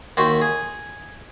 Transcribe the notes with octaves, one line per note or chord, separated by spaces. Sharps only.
D#2 F#4 G4 C6
G#4